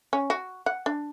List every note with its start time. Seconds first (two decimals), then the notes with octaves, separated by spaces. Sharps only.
0.13 C#4
0.30 F#4
0.66 F#5
0.86 D4